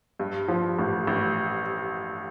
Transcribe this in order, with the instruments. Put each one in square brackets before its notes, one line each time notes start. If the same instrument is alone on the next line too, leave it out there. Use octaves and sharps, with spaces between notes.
[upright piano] G2
F3
A1
A1